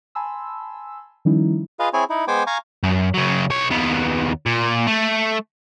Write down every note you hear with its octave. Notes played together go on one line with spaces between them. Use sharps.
G#5 A5 B5 C6 E6
D#3 F3 G3 C#4 D#4 E4
F4 G#4 B4 D#5 F5
C4 E4 G#4 C#5 G#5
D#4 E4
G#3 B3 C5 G5 G#5 D6
F5 G#5 A#5 C#6
F#2
C#3 F#3
B1 C#5
D#2 B3
A#2
A3